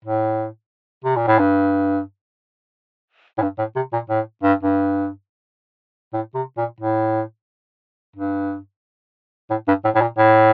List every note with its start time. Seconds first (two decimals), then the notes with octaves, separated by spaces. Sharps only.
0.05 A2
1.04 C3
1.16 A#2
1.27 A2
1.39 G2
3.38 A2
3.42 G2
3.58 A2
3.76 C3
3.93 A#2
4.10 A2
4.43 G2
4.63 G2
6.13 A2
6.35 C3
6.57 A#2
6.80 A2
8.16 G2
9.50 A2
9.68 G2
9.84 A2
9.95 A2
10.01 A#2
10.18 A2